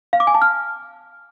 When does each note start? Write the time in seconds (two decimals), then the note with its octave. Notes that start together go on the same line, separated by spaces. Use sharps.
0.13 F5
0.20 D6
0.27 G#5
0.34 A5
0.42 F6